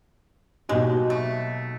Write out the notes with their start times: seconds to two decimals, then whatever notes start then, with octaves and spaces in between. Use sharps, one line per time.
0.69 B2 F#3 G#3 A#3 D#4 G4
1.10 A3